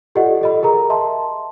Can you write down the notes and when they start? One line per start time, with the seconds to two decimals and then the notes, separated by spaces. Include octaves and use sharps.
0.15 F4 G4 A4 D5 D#5 F#5
0.41 A4 D#5 B5
0.63 G#4 A#4 A#5
0.90 D#5 E5 A5 C6